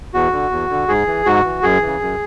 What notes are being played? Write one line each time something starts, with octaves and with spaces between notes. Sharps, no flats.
E2 F#4
D3
E2
D3
G#2 G#4
E3
G#2 F#4
E3
F#2 G#4
C#3 E3
F#2